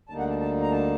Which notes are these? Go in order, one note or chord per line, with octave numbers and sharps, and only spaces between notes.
D2 D3 G3 A#3 D#4 A5
F#5
A5
A5
A#5
A5